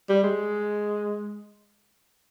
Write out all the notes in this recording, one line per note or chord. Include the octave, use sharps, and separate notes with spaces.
G3
G#3